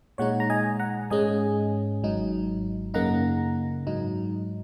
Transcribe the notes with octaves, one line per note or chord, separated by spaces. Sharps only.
A#2 G#3 D#4 C#5 F#5
A#5
D#5 G#5
F#5 A#5
G#2 G#3 C#4 D#5 G#5
G#1 G#2 F#3 D#4
F#2 C#3 A#3 D#4 F#5 A#5
G#2 F#3 D#4